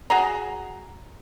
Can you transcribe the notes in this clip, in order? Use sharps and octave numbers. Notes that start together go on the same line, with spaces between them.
F#4 G#4 A#5